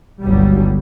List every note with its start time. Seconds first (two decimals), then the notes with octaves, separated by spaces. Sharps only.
0.21 G1 C#2 F#3 G3